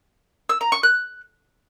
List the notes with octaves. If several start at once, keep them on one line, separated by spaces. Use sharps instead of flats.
E6
A#5
C#6
F#6